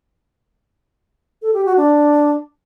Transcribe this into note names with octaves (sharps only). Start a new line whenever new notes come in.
A4
G4
F#4
D4